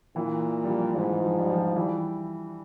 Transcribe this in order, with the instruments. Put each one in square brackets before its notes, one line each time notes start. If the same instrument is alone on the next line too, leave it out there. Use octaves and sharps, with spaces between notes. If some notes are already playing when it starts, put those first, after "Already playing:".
[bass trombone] A#2 [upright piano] E3
[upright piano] G3
F3
[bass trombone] G#2 [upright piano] E3
[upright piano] F3
G3
F3
E3 G3